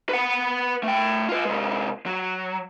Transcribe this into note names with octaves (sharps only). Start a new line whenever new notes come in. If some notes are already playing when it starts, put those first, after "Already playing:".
B4 F#5
A3 G5
F4 B4
C3 G#3
F#3